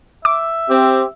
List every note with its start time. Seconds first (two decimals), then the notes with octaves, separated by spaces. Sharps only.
0.25 E5 D6
0.69 C4 G4